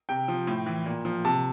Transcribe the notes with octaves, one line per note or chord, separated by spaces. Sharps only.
C3 G5
F3
A2
E3
A#2
F3
C3 A5